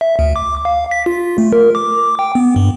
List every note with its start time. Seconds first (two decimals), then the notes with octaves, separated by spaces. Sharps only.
0.01 E5
0.19 D2
0.36 D6
0.65 F5
0.91 B6
1.06 F4
1.38 A3
1.53 A#4
1.75 D6
2.19 G5
2.35 B3
2.56 G2